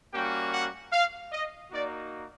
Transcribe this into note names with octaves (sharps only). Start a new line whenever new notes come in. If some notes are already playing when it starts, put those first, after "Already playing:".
G3 A#3 C#4 F#4 G5
F#5
F5
D#5
A#3 D#4 F#4 D5